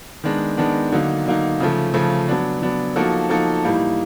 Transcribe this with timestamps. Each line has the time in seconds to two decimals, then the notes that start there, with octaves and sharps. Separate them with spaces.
0.24 D#3 G#3 B3 D4
0.58 D#3 G#3 B3 D4
0.92 D3 F#3 A#3 D#4
1.27 D3 F#3 A#3 D#4
1.60 C#3 F3 A3
1.94 C#3 F3 A3
2.28 F#3 B3 D4
2.62 F#3 B3 D4
2.96 F3 A#3 D#4 F#4 A4
3.29 F3 A#3 D#4 F#4 A4
3.64 A2 E3 G3 A#3 D#4